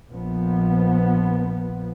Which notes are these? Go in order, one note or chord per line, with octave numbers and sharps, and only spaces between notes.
A#1 F3 B3